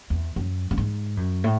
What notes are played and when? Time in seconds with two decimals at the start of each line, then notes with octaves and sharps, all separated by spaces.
0.10 E2
0.36 F#2
0.71 F#2
0.78 G#2
1.17 F#2
1.44 A2